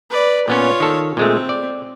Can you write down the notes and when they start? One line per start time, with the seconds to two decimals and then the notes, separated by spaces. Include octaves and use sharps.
0.10 B4 D5
0.48 A#2 B3 C#4 F4 C#5
0.80 D#3 A4
1.17 A#2 G#3 A3 C4
1.49 D5